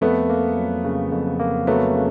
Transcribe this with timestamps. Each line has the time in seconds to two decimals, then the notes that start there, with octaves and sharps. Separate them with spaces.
0.01 F2 A3 B3
0.30 A#3
0.57 F#3
0.84 C#3
1.12 F2
1.39 A#3
1.67 F#3 A3 B3
1.95 C#3